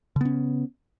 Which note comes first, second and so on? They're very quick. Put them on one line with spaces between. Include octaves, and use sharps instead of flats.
C#3 B3 C#4